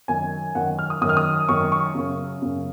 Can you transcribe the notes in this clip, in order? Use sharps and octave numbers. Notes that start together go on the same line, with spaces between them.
F#2 D#3 G#5
F#2 D#3 F#5
F6
D#6
F#2 D#3 D#6 F6
D#6
F#2 D#3 C#6
C#6
F#2 C#3
F#2 C#3